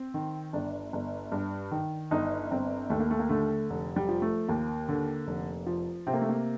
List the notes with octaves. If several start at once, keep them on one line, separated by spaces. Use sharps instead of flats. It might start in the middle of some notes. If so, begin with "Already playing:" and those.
Already playing: C4
D#3
G1 D4
G1
G2
D#3
G1 D#4
G1 C4
D#2 A3
A#3
A3
A#3
D3 A3
F1
G3
F3
A3
D#2 A#3
D3
F1
F3
C3 C4
A#3
A3
A#3